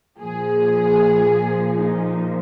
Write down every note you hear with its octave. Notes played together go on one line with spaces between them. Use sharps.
A#2 F3 G#4
D#4